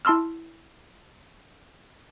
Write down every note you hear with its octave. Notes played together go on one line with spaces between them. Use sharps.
E4 A5 C6 E6 F6